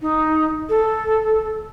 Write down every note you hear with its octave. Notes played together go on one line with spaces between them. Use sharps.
D#4
A4